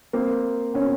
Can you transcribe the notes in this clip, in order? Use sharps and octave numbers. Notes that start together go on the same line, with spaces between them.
A#3 C4
B3 C#4